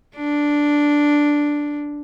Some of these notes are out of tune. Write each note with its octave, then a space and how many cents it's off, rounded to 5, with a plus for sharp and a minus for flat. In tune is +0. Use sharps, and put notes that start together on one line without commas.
D4 -5